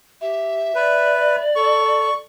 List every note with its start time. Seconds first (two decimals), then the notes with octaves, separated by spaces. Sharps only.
0.21 G4 E5
0.75 B4 D5
1.56 A4 C#6